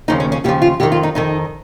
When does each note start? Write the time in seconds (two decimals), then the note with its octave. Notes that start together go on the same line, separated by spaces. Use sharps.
0.08 D#2 C#3 F3 D#4
0.20 C#4
0.32 C#4
0.44 D#2 C#3 F3 G4
0.62 F4
0.80 F2 D#3 G4
0.92 F4
1.03 D#4
1.15 F2 D#3 D#4